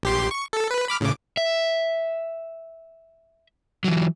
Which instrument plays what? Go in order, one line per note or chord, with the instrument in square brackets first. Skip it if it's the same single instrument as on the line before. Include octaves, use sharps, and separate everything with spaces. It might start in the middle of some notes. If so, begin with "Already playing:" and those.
[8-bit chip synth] A#1 G4 C6
C#6
A4
B4
B5 D6 F6
A2 C#3 D6
[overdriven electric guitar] E5
E3 F#3